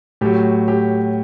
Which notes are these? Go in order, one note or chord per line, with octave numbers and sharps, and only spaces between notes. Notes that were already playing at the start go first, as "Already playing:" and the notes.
A2 F#3 G4
G4